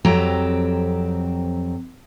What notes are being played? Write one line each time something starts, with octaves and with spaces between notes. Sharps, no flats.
F2 F#3 C4 G4 A#5